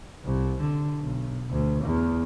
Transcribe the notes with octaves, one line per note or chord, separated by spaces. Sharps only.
C2
D3
B1
D2
E2